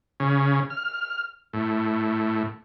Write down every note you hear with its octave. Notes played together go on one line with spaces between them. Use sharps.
C#3
F6
A2